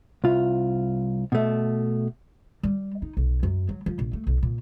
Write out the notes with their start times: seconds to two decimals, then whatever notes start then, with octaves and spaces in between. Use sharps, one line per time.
0.24 C2 F4
1.32 B2 A3
2.63 G3
3.02 D#4
3.17 B1
3.43 F#2
3.69 F#3
3.86 F3
3.99 A#1
4.13 A3
4.27 B1
4.43 A#2